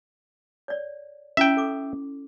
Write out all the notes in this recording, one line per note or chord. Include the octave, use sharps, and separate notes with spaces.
C#5 D5
C#4 E4 E5 G5
A4 D6